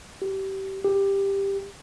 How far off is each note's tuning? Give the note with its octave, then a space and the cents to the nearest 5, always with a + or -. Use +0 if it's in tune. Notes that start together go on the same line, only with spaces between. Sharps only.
G4 -25
G4 +10